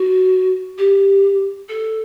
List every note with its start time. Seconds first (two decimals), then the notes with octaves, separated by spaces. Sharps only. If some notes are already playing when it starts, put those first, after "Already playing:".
Already playing: F#4
0.77 G4
1.68 A4